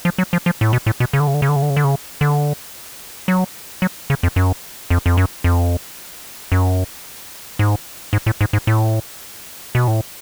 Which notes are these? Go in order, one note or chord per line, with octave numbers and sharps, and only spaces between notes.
F3
F#3
F3
F3
A2
B2
A2
B2
C#3
D3
C#3
D3
C#3
D3
C#3
D3
C#3
D3
C#3
D3
F#3
F#3
C#3
F2
F#2
F2
F2
F#2
F2
F#2
G#2
G#2
A2
G#2
G#2
A2
B2
A2